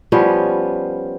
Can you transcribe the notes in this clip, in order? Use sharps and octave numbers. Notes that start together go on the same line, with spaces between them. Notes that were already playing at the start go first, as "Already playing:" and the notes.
F3 G3 B3 C#4